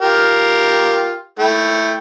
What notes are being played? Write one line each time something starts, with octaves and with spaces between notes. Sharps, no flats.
F4 G4 A#4
A3 E4 G5